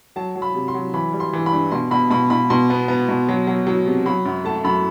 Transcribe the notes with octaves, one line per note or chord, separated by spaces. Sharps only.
F#3 A5
F#3
B5
C3
C6
F#3
E3 B5
G3
C6
E3
B5
G2
B2 C6
B2 B5
B2 B5
B2 B5
B2 C6
B3
B3
B2
F#3
F#3
F#3
C3
F#3 B5
F#2
A3 A5
F#2 B5